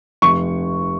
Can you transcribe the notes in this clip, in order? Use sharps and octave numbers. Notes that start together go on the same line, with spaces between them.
F1 C#6